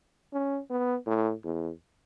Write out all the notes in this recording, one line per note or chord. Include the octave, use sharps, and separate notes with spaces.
C#4
B3
A2
E2